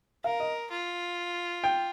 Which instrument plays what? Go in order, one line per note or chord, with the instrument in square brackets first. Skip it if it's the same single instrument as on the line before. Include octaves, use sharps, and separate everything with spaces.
[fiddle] A#4 [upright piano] F5
[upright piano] D#5
[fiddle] F4
[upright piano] G5